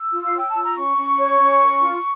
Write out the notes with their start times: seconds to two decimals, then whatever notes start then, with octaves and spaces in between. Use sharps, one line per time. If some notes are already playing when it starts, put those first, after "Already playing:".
Already playing: E6
0.12 F4
0.25 F5
0.34 C#5 G5
0.49 A5
0.55 F4
0.63 A#5
0.76 C#4 C#6
0.97 C#4
1.18 C#5
1.39 C#4
1.61 A#4
1.81 F4